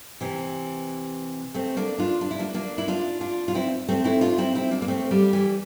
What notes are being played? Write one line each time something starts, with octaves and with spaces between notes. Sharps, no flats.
C3 E3
A3 C4
A#3 D4
D4 F4
D4
E4
A#3 D4
A#3 D4
E4
D4 F4
D4 F4
F4
C4 E4
A3 C4
C4 E4
D4 F4
C4 E4
C4 E4
A#3 D4
A#3
A3 C4
G3 A#3
E3 G3